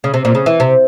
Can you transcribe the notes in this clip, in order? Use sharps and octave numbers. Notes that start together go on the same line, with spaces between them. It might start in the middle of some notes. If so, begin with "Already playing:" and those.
C#3
C3
A#2
C#3
E3
C3